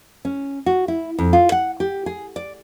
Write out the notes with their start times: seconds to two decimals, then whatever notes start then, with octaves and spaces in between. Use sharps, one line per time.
0.25 C#4
0.66 F#4
0.88 E4
1.19 F2
1.33 F4
1.52 F#5
1.80 G4
2.06 G#4
2.36 D5